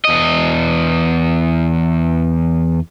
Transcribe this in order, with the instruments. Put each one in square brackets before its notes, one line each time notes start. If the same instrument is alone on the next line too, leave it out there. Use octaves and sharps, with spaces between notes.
[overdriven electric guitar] E2 D#5